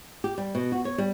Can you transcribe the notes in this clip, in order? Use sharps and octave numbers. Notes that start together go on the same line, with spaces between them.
G4
G3
B2
F#4
C#5
G3